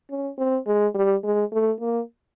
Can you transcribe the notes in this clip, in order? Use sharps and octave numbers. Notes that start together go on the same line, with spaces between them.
C#4
C4
G#3
G3
G#3
A3
A#3